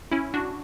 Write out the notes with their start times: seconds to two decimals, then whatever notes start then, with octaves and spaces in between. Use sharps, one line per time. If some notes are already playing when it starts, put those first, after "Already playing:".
0.12 C#4 E4
0.34 D4 F#4